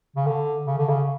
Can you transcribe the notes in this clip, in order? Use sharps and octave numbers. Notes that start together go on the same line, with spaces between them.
C#3
D3
C#3
D3
C#3